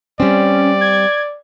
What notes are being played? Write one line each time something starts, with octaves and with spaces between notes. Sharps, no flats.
G3 C4 C#4 D5
G#6